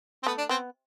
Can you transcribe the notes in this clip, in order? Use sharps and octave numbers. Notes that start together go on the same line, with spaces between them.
C4
A3 B3
D4
B3 C4